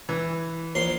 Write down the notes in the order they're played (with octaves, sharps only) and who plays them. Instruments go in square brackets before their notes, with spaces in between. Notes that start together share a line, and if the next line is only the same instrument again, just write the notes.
[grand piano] E3
[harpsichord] A#1 C6